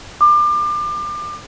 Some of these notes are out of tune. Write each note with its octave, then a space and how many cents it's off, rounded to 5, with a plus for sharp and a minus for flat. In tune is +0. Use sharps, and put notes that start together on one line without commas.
D6 +30